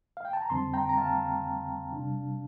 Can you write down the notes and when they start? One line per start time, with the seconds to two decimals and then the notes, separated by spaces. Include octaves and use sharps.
0.17 F5
0.25 G5
0.33 A5
0.42 A#5
0.50 F2 D3 G3 C4 A5 C6
0.74 G5 A#5
0.89 A#5
0.98 F5 A5
1.93 C3 G3 D4